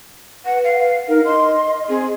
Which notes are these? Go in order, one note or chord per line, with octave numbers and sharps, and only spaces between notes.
B4 F#5
F5
D#4 A#4
D#5 C6
C4 G#4